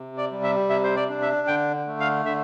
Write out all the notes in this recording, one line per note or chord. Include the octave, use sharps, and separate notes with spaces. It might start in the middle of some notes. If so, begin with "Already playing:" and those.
Already playing: C3
D5
G3
E5
C3 E5
C5
D5
D4
E5
D3 G5
A3
F5
D3 E5